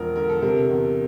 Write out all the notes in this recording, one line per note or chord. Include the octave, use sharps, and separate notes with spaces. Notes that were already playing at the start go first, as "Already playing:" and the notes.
Already playing: E1 F3 A#4
D3 A#4
A4
C3 A#4
E2